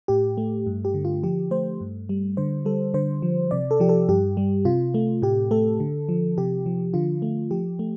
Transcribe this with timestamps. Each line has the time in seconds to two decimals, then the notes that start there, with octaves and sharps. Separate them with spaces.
0.08 A2 G4
0.37 A3
0.66 G2
0.85 G4
0.94 D3
1.05 F4
1.23 F3 G4
1.51 A3 C5
1.81 G2
2.09 G3
2.37 D3 C5
2.66 G3 A4
2.94 D3 C5
3.22 F3
3.51 C3 D5
3.71 A4
3.80 F3 G4
3.89 A4
4.09 G2 G4
4.37 G3
4.65 C3 F4
4.94 A3
5.22 A2 G4
5.51 A3 A4
5.80 D3
6.09 F3
6.38 C3 G4
6.66 F3
6.94 D3 F4
7.22 A3
7.51 F3 G4
7.79 A3